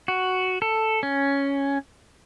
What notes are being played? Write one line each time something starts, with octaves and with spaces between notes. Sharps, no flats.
F#4
A4
C#4